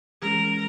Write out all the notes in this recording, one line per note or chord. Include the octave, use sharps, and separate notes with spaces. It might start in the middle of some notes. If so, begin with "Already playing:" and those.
E3 G#3 C#4 A#4